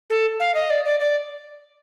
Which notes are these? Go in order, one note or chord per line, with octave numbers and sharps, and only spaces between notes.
A4
F5
D#5
D5
D5
D5